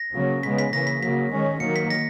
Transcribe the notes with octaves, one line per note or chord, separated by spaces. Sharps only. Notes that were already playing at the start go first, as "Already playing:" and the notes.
Already playing: A#6
C#3 F#3 A#3 C#4
C#3 G#3 B3 B6
B6
C#3 E3 A#3 A#6
B6
C#3 F#3 A#3 B6
D#3 G#3 C#4
D#3 F#3 A#3 C#7
B6
A#6